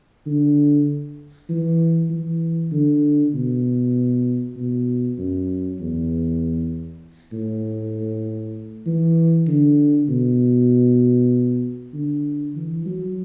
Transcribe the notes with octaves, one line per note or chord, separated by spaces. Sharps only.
D3
E3
E3
D3
B2
B2
F#2
E2
A2
E3
D3
B2
D3
E3
F#3